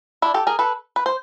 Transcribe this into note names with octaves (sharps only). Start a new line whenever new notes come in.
D4 E4
G4 A4
G#4 A#4
A4 B4
B4
C5